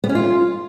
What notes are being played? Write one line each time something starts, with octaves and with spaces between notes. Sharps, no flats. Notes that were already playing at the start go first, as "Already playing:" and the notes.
B3
C#4
F4